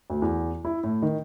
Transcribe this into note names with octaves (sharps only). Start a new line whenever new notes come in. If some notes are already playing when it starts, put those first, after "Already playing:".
D2
E2
E4
A2
D#3